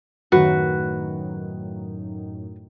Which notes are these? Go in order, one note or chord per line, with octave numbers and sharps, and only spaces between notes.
F#2 A2 D#3 F#4 B4